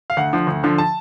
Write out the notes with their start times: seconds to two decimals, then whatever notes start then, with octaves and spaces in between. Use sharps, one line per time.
0.10 F5
0.17 D2 F#5
0.33 D3 F3
0.47 D2
0.63 D3 F3
0.78 A5